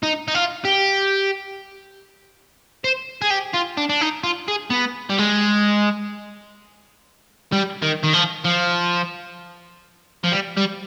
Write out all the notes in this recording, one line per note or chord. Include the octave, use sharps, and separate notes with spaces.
D#4
D#4
F4
G4
C5
G#4
G4
F4
D4
D4
D#4
F4
G#4
B3
G3
G#3
G3
D#3
D#3
F3
F3
F3
G3
G3